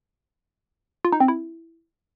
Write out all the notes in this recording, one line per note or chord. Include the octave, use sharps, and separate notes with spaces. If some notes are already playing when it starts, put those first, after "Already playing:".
F4
D#4
C4
E4